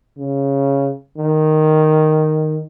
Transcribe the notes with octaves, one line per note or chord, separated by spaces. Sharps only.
C#3
D#3